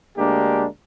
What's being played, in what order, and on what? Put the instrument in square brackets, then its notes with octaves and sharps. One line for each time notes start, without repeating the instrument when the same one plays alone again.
[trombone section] D2 G#3 A#3 D4 G4